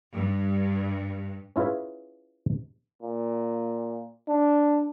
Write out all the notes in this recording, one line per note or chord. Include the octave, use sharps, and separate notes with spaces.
G2
C#4 E4 F4 G#4 B4
A#2
D4